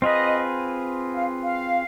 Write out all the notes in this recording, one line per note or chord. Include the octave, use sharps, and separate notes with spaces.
C4 F4 G#4 B4 D#5
F5
F5